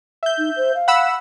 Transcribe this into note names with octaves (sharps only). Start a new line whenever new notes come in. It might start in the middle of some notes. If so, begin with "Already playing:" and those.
E5 G6
D#4
C5
F5
F#5 B5 E6